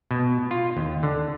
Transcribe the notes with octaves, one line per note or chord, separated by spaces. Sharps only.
B2
F4
D#2
D3